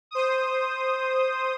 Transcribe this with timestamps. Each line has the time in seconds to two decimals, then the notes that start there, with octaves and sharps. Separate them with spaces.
0.11 C5 D#6